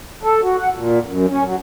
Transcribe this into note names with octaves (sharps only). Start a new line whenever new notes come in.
A4
F#4
F#5
A#2
F#2
C#4
F#3